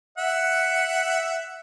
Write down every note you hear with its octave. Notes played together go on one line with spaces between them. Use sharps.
E5 F#5